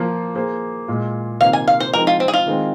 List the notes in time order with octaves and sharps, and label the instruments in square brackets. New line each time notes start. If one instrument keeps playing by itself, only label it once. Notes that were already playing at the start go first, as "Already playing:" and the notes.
Already playing: [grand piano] F3 A#3 F4
A#3 G#4 C5
A#2 G#3 F4
[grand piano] C3 D#3 A#3 F4 C5 [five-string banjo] F5
[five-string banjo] G#5
F5
C5
[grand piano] F3 G#3 C4 D#4 [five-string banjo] A#4
[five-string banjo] F4
C4
G#4
F4
[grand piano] D#3 G#3 C4